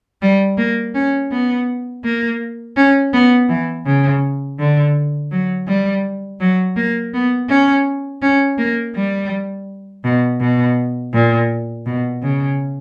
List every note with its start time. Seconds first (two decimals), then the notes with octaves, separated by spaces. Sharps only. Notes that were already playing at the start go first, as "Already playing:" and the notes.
0.22 G3
0.57 A#3
0.94 C#4
1.31 B3
2.04 A#3
2.77 C#4
3.13 B3
3.48 E3
3.86 C#3
4.59 D3
5.31 F#3
5.68 G3
6.40 F#3
6.76 A#3
7.14 B3
7.49 C#4
8.22 C#4
8.58 A#3
8.95 G3
10.04 B2
10.40 B2
11.13 A#2
11.86 B2
12.23 C#3